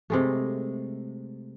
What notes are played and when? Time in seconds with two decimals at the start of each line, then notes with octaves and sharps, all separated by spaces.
0.10 C3 G#3 A3